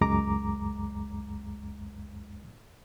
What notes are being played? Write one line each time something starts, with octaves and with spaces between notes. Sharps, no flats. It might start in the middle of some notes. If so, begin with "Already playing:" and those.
C#2 F#2 G#3 A#5 D6